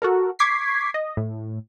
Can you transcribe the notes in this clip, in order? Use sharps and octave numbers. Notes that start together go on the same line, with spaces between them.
F#4 A4 A#4
C#6 D6 G#6 B6 C7
D#5
A2